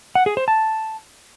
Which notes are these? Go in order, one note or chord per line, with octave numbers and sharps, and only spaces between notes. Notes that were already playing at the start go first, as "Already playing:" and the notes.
F#5
G#4
C5
A5